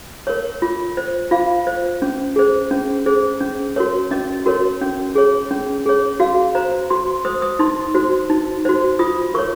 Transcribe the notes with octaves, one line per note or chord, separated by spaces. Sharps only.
A#4 C#5
F4
C5
F4 F5
C5
C#4
G#4 C5
C#4
G#4 C5
C#4
F#4 A#4 C#5
C#4 D#5
F#4 A#4 C#5
C#4
G#4 C#5
C#4
G#4 C#5
F#4 F5
C5 A#5
F#4 C6
C5 D#6
D#6
D#4 C6
F#4 C5
D#4
F#4 C5
F4 D#6
A#4 C#5 C#6